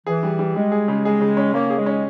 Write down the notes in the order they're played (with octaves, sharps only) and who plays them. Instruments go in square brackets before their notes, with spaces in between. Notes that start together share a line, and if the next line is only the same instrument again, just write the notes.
[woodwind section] E3 [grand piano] G#4
[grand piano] G3
G3
[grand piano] G3 [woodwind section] G#3
[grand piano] G#4
C#3
[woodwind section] G#3 [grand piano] G#4
[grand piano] C#3
C#4
[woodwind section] A#3 [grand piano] C#4
[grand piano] G#4
[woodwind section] G#3
[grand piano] C#4